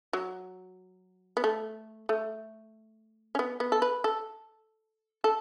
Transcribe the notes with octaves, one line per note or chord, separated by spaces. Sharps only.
F#3
B3
A3
A3
C#4
B3
B3
A4
B4
A4
A4